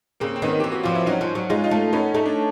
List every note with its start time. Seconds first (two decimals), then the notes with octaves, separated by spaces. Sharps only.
0.20 C#3 A#3 C4
0.36 C4
0.42 D#3 B3 C#4
0.60 E3 G4
0.72 F#4
0.83 F3 F4
0.95 E4
1.06 F#3 C#4 D#4
1.21 F3
1.35 F#3
1.49 G#3 D#4 F4
1.64 D#4 F4
1.71 A3
1.93 B3 C#4 D#4
2.14 A3 D#4
2.26 D4